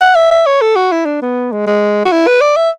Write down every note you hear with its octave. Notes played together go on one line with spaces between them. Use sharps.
F#5
E5
E5
C#5
A4
F#4
E4
D4
B3
G#3
G#3
F#4
E4
B4
D5
E5